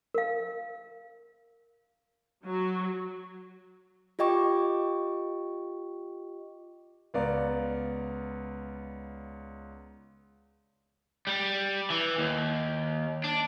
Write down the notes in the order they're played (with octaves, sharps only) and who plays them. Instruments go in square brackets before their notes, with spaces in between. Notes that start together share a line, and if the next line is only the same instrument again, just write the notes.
[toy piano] A#4 F5
[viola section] F#3
[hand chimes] F4 G4 D#5 G5 C#6 D6
[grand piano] C#2 B3 D5 F5 A#5
[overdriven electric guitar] G3
E3
D#2
D4